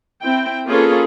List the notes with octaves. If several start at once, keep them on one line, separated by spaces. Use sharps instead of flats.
C4 E4 G5
A#3 C#4 F4 G#4 A4 B4